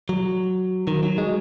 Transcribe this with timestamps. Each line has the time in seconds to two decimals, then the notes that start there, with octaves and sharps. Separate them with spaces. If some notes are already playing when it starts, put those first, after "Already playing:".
0.09 F#3
0.87 D#3
1.03 F#3
1.18 G#3